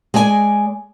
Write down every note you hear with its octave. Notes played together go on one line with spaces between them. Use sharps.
G#3 G#4 D5 G#5